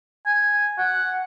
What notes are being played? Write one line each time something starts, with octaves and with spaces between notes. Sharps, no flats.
G#5
F#5